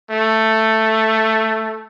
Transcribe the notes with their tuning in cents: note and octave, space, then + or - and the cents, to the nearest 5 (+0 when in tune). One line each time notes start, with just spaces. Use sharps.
A3 +5